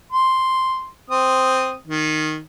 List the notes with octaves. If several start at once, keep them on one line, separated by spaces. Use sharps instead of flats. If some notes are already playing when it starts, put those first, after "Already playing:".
C6
C4 D#6
D#3